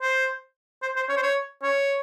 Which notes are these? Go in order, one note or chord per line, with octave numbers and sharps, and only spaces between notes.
C5
C5
C5
C#5
C5
C#5
C#5